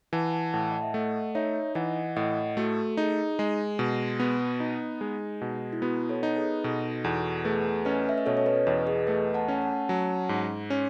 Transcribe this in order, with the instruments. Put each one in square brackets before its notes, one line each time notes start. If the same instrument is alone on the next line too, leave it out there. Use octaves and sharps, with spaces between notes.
[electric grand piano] E3 [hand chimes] F#5 A5
[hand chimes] F#5 A5
[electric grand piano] A2 [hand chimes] F#5 A5
[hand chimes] D#5
E5
[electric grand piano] A3 [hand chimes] D#5 F#5
[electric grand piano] D#4 [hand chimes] C#5 E5
[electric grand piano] E3 [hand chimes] D#5 F#5
[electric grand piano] A2 [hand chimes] D#5 F#5
[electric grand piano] A3 [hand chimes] F#4 A4
[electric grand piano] D#4 [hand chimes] G#4
[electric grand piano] G#3
B2
[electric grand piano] B3 [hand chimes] F#4
[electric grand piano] D#4
G#3
B2
[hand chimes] E4
[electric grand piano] B3 [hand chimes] F#4
[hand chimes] A4 C#5
[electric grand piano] D#4
[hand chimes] G#4 B4
[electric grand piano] B2 [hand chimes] F#4 A4
[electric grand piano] E2 [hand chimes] F#4 A4
[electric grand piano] A3 [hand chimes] G#4 B4
[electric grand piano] C#4 [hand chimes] B4 D#5
[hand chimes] E5
D#5
[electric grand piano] B2 [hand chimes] A4 C#5
[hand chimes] C#5
B4 D#5
[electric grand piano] E2 [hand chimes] B4 D#5
[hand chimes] G#4 B4
[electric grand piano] A3 [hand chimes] B4 D#5
[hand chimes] F#5 A5
[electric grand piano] C#4
[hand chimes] F#5 A5
[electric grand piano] F#3 [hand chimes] F#5 A5
[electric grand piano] G#2
C#4